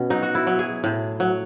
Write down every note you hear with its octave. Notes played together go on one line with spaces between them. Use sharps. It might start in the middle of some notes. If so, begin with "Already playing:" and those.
Already playing: B2 B3 C#4
F#3 D#4
F#4
E4
F#3
G#4
A2
F#3